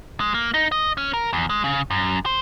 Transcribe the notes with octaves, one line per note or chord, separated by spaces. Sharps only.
G#3
A#3
D#4
D#5
C#4
A#4
E2
G#3
C#3
F#2
C5